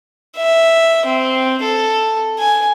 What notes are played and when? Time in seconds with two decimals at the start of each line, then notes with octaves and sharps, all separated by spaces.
0.37 E5
1.06 C4
1.63 A4
2.39 G#5